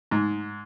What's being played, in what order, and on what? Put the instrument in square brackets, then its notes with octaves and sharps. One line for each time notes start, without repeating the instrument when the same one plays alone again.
[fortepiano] G#2